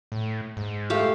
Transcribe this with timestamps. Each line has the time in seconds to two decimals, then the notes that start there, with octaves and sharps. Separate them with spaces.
0.12 A2
0.57 G#2
0.90 A3 G4 F5